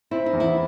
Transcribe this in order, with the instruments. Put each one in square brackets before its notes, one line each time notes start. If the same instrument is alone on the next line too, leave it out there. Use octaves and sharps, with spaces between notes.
[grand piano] C4 [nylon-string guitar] E4
[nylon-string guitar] D#4
[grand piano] E2
[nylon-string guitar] E4